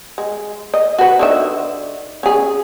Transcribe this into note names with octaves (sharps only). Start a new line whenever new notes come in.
G#3
D#5
F#4 B4
D3 D#3 E5
C#4 G#4